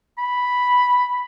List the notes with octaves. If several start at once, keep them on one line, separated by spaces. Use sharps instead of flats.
B5